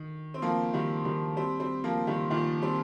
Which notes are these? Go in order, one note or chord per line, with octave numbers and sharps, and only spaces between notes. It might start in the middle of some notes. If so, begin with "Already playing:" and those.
Already playing: D#3
C4
F3 A#3
D#3 G3
D#3 G3
G3 C4
G3 C4
F3 A#3
D#3 G3
A#2 D#3
G3 C4